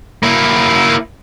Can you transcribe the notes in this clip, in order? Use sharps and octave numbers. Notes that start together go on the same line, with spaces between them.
A#3 E4